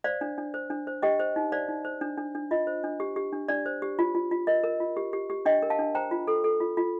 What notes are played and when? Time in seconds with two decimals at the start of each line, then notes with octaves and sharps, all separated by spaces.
0.04 C5 D5 F5
0.21 D4
0.38 D4
0.54 C5
0.70 D4
0.87 C5
1.02 G4 D#5 G5
1.20 C5
1.36 D#4
1.52 C5 D5 F5
1.69 D#4
1.85 C5
2.01 D4
2.18 D4
2.35 D4
2.51 F4 D#5
2.67 C5
2.84 D4
3.00 G4
3.16 G4
3.33 D4
3.48 D4 D5
3.66 C5
3.82 G4
3.99 F4
4.15 F4
4.31 F4
4.47 A#4 D#5
4.64 A#4
4.80 F4
4.97 G4
5.13 G4
5.30 G4
5.45 D4 D#5 G5
5.63 A#4
5.70 F5 A5
5.79 D4
5.95 C5 G5 A#5
6.11 F4
6.27 A4
6.44 A4
6.60 F4
6.77 F4